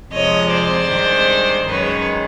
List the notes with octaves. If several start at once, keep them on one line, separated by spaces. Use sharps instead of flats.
F2 C3 F3 G#3 C#5 D#5
C5 D5
G2 D#3 G#3
F#2 D#3 G#3 B4 C#5